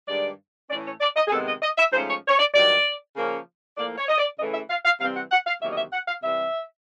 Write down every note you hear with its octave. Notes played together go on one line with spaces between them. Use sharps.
G2 D#3 G#3 D5
A2 E3 A3 C#4 D5
C#5
D5
D#5
G#4
C3 D#3 G#3 B3 A4
D#5
D#5
E5
G#2 F3 A3 C#4 C5
C#5
C#5
D5
G2 D#3 F#3 D5
C#3 F3 A#3 C#4
A2 F3 A#3 D5
C#5
D#5
D5
C#3 E3 A3 D#5
E5
F5
F5
C3 E3 G3 C4 F5
F#5
F#5
F5
E2 C3 D#3 F#3 A#3 E5
D#5
E5
F#5
F5
C3 E3 G3 E5